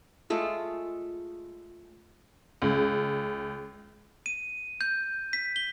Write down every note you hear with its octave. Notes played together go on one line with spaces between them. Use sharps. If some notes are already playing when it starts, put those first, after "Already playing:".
G#3 A3 F4
C#2
D#7
G6
B6
G7